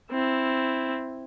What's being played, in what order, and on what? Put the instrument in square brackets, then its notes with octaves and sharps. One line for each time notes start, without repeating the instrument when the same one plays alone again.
[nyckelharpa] C4 E4